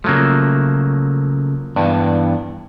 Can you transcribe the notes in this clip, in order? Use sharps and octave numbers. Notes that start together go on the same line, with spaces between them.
C#3 F3 F#3 A3 A#3
G2 E3 B3 D4